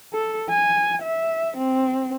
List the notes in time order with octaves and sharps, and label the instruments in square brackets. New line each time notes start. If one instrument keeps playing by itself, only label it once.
[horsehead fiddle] A4
G#5
E5
C4